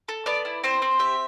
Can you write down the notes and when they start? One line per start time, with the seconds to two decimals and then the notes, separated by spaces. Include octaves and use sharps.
0.09 A4
0.26 B3 D5
0.45 E4
0.64 C4 C5
0.82 C4
0.99 G4 E5